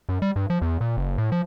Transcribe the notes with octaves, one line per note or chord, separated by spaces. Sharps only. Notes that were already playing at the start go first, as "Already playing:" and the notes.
F#2
G3
G2
F3
E2
A#2
F#1
A2
F3